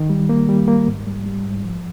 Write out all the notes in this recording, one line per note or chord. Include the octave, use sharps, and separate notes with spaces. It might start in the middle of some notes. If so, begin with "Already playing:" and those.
Already playing: D#3
G3
A#3
G3
A#3
G#2
G3
G3
G#2
F3